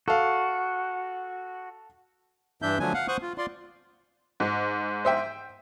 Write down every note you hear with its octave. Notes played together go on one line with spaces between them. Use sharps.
F#4 A4 F5
G2 E3 D4 E5 G6
D3 F3 F#3 A3 D4 G#5
F5 F#5
C5 F#5 C#6 D#6 F#6
F4
F4 D5 C6
G#2
C5 E5 G5